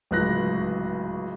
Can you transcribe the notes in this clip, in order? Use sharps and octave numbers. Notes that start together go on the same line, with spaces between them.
D1 C#2 F#6 A#6